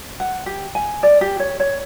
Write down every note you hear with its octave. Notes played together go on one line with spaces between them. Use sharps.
F#5
G4
G#5
D5
G4
C#5
C#5